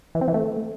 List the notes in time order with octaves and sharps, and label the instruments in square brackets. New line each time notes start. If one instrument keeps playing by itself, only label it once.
[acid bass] E3
C4
E3
A3